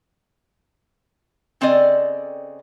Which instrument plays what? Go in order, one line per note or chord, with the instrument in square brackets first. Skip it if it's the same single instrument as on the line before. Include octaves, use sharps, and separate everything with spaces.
[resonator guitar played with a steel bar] C#3 C4 A4 D5 D#5